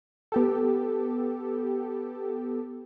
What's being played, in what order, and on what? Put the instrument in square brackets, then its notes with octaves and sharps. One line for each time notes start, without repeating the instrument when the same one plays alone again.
[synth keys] B3 G4 A4